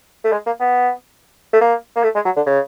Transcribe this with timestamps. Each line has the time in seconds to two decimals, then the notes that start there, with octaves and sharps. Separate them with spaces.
0.24 A3
0.32 G#3
0.46 A#3
0.60 B3
1.54 A3
1.61 A#3
1.96 A#3
2.04 A3
2.15 G#3
2.25 F#3
2.36 D3
2.46 C#3